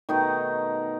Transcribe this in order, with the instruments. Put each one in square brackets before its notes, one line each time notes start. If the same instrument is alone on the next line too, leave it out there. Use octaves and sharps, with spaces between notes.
[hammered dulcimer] B2 D#3 A3 D#4